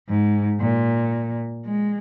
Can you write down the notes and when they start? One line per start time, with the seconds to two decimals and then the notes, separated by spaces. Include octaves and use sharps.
0.09 G#2
0.61 A#2
1.66 G#3